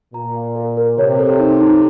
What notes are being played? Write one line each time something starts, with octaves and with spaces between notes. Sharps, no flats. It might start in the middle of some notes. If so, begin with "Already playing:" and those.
A#2 A#5
F5
A#4
A#4
C3 C#5
A4
D#4
D#4